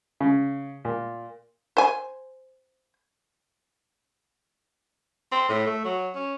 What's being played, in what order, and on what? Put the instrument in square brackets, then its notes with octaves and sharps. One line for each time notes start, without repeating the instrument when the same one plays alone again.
[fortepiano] C#3
A#2
[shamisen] C5 G#5
[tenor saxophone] C4
A2
A3
F#3
C#4